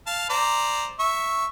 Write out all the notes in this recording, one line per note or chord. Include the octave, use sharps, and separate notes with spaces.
F5 A5
C5 D5 A#5
E5 C#6